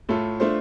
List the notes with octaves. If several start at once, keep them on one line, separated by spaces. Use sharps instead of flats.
A2 A3 F4 A4
A3 D4 F4 C5